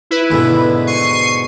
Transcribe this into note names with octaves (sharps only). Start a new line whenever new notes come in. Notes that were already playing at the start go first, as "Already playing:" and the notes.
E4 B4
D2 G#2 B2
C#6 C7 D#7